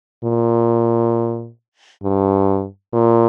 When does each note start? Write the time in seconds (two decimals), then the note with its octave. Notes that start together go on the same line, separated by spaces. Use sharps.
0.24 A#2
2.03 G2
2.93 A#2